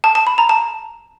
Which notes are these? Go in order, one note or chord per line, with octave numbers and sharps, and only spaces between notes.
A5
A5
B5
A#5
A5